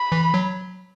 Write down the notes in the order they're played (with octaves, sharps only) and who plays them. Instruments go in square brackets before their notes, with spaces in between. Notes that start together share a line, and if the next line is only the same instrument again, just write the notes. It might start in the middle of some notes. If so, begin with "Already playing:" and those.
Already playing: [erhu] B5
[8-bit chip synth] E3
F#3